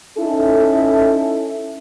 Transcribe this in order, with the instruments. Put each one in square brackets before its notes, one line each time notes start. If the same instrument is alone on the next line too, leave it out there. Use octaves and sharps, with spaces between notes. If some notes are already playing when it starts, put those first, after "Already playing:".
[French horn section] C#4 D#4 E4 A4